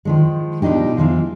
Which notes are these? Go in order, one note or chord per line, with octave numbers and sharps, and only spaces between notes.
D#3 F3 G#3
B2 F3 D4 D#4 G4
E3 F3 G#3 F4